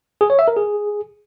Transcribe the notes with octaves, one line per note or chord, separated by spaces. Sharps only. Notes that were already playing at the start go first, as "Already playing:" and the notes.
G#4
C#5
E5
A#4
G#4